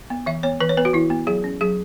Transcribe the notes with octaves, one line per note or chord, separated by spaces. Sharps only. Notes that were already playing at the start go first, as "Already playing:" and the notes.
B3
E3 E5
B3 C#5
E3 B4
C#5
B3 B4
F#4
E3 E4
B3
F#3 G#4
C#4
F#3 G#4